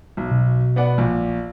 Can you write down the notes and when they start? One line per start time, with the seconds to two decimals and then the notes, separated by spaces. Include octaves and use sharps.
0.17 B1
0.31 B2
0.76 B3 D5 F#5
0.98 A#1